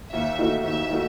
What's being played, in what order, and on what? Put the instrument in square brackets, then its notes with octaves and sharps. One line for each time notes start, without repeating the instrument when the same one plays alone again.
[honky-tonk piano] D#2 [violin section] E5
[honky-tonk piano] D#3 A3 D#4 F#4
[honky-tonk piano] D#2 [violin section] E5
[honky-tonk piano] D#3 A3 D#4 F#4